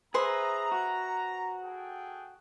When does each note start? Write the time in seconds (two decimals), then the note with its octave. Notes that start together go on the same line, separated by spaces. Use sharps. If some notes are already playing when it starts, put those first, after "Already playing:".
0.14 G#4 B4 C5 E5 A#5
0.72 F#4
1.64 G#4 A4 G5